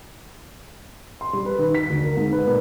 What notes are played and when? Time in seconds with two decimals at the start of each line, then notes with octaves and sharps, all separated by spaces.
1.21 C6
1.33 G3
1.46 B4
1.59 D#3
1.75 B6
1.90 D2
2.03 A#4
2.17 G#2
2.33 B4
2.47 A#2